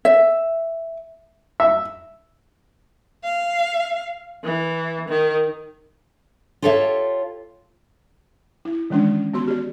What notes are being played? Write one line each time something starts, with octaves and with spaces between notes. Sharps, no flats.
E5
E5
F5
E3
D#3
F4 G4 A4 C#5 D#5 E5
E4
D#3 E3 G#3 C#4 D4
B3 F#4 C6
G4 D5